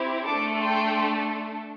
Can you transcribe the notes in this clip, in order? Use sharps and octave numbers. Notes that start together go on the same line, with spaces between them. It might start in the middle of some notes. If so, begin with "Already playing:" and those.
Already playing: C4 E4 G4
A3 D4 A4 A5 D6
G5 C6